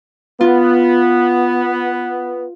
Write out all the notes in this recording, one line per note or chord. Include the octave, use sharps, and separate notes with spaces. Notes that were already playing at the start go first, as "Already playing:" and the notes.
B3 F4